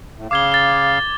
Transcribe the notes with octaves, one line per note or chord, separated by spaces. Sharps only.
A2
C#3 F5 D6 G#6 G7
A6 G7